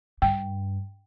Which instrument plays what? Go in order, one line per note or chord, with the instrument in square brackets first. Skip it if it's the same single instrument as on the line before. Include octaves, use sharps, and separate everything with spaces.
[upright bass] G2 [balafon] G5